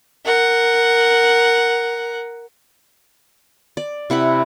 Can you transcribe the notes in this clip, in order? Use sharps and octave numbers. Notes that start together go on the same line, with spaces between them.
A#4 F#5
D5
C3 E4 F#5 B5